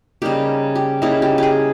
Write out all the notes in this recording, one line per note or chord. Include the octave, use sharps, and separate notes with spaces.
C#3 G3 A#3 D#4 G4
G4
C#3 G3 A#3 D#4 E4
G4
G4 G#4